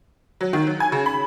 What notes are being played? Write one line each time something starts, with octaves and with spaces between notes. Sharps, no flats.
F#3
D#3
F#3
G#5
C#3
B5